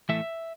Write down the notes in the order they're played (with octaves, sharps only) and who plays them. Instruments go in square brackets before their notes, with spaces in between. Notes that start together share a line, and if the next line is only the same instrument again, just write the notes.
[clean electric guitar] A2 E3 A3 E5